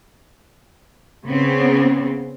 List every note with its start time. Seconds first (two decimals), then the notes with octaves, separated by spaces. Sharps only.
1.24 C#3 B3 C4